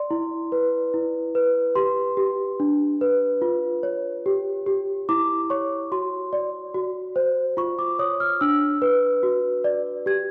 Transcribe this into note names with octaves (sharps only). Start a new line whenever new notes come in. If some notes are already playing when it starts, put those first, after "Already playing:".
Already playing: D5 C6
E4
B4
E4
B4
G4 C6
G4
D4
B4
F4
C#5
G4
G4
E4 D6
C#5 C#6
F#4 C6
D5
F#4
C5
F4 C#6
D6
C#5 D#6
F6
D4 E6
B4
F#4
D5
G4 G#6